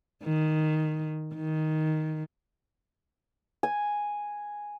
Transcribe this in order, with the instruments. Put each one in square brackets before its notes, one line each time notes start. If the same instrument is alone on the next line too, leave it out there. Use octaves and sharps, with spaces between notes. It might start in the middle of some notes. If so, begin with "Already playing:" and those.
[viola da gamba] D#3
D#3
[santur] G#5